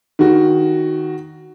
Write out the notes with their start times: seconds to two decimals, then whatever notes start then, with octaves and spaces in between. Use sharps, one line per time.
0.19 D#3 F#4